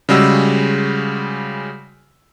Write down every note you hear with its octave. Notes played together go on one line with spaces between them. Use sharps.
C#3 G3 G#3 F#4 E6